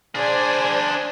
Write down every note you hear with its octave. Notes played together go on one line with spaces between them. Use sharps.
D4 G#4 C5 D5 G#5